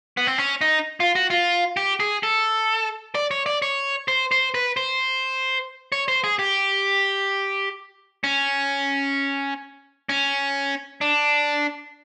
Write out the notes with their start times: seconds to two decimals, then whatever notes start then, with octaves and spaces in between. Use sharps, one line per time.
0.17 B3
0.27 C4
0.38 C#4
0.61 D#4
1.00 F4
1.15 F#4
1.30 F4
1.77 G4
2.00 G#4
2.23 A4
3.15 D5
3.31 C#5
3.46 D5
3.62 C#5
4.08 C5
4.32 C5
4.54 B4
4.77 C5
5.92 C#5
6.08 C5
6.24 G#4
6.39 G4
8.24 C#4
10.09 C#4
11.01 D4